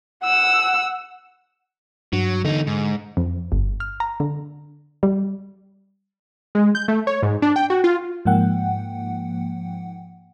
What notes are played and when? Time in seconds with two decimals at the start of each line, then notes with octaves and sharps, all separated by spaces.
0.23 F#5 E6
2.13 G2 F#3
2.45 E2 D3 D#4
2.67 G#2
3.17 F2
3.52 G1
3.80 F6
4.00 A#5
4.20 D3
5.03 G3
6.55 G#3
6.75 G6
6.88 A3
7.07 C#5
7.23 G#2
7.42 D4
7.56 G5
7.70 F#4
7.84 F4
8.25 G#2 F3 A#3 F#5 G5